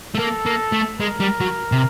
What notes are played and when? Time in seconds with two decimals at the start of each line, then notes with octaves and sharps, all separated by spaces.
0.15 A3
0.19 A#3 A4
0.46 A#3
0.73 A3
1.00 G#3 A#4
1.20 G3
1.40 F#3
1.72 C3